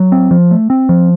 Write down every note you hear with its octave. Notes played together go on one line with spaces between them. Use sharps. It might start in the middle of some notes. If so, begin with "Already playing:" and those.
Already playing: F#3
C4
F3
A3
C4
F3